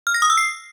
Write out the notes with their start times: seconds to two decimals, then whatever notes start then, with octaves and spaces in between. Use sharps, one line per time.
0.07 F6
0.14 A#6
0.22 D#6
0.30 E6
0.37 C7